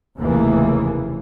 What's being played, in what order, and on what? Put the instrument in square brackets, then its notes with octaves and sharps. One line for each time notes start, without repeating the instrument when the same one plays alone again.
[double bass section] F1 D#2 C#3 E3 A#3